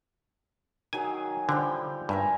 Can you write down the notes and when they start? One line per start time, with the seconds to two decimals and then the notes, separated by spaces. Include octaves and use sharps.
0.93 D#3 F#3 G#4 G#5
1.49 D3 F3 G3 G5
2.09 G2 A#4 E5 G#5